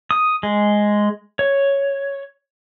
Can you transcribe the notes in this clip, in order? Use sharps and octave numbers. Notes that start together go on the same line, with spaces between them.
D#6
G#3
C#5